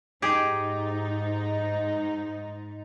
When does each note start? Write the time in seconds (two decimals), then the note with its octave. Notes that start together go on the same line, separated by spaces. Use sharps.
0.22 G#2 D#4 G4 G#4